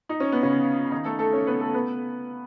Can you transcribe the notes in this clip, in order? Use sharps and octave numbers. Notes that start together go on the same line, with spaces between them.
D#4
C#4
B3
C#3 C#4
D#3 D#4
A3 A4
A3 A4
C#4 C#5
B3 B4
A3 A4
B3 B4